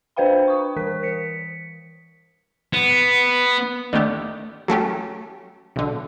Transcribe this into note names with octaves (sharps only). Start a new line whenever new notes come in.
D4 B4 C5 F5 G5 B5
C#6 D#6
E3 A#4 B6
B6 C#7
B3
D3 D#3 A3 G4
F#3 A3 C#4 G4
B1 D3